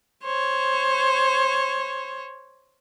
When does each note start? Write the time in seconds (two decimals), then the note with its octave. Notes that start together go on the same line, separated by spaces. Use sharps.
0.24 C5 C#5